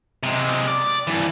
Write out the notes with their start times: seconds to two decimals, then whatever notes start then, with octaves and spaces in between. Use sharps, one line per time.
0.23 C3 G#3
0.68 D5
1.07 G2 E3